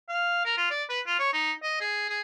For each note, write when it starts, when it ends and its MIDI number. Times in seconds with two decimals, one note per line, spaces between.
0.09 0.44 77
0.45 0.53 70
0.57 0.67 65
0.70 0.84 74
0.89 1.00 71
1.06 1.14 65
1.19 1.31 73
1.33 1.52 63
1.63 1.80 75
1.81 2.09 68
2.09 2.21 68